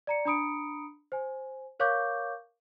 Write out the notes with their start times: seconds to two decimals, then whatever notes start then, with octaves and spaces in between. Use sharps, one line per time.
0.07 D5 A#5 C#7
0.25 D4 A#5 B5 D#6 C#7 D7
1.12 C5 G#5
1.80 A#4 C#5 F5 C#6 D6 G6